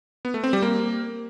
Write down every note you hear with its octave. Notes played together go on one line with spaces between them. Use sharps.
B3
A3
C4
G3
A#3